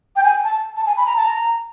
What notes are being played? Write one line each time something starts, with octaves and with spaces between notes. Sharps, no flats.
G5
G#5
A5
A5
G#5
B5
A#5
A5
A#5